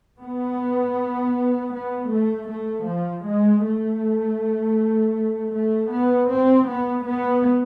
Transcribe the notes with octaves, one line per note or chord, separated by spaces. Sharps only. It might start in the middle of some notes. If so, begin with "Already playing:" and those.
B3
B3
A3
A3
F3
G#3
A3
A3
B3
C4
B3
B3